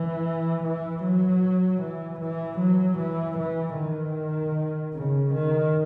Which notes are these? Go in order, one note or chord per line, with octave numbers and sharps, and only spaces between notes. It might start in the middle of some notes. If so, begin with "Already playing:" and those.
Already playing: E3
E3
F#3
E3
E3
F#3
E3
E3
D#3
C#3
D#3